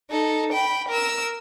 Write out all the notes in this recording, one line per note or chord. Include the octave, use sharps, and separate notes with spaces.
D#4 A4
G5 B5
A#4 E6